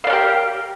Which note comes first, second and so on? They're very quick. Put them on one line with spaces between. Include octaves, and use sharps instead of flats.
F5 D5 A#4 G4